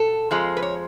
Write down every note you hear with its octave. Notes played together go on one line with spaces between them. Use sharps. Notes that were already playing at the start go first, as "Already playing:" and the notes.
Already playing: B2 A4
F2 F3 G#3
B4
C#5